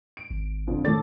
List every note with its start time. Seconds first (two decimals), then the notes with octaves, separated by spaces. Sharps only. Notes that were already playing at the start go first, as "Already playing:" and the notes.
0.17 D7
0.30 G#1
0.67 F2 D3
0.85 A2 D#3 A4 D5 A6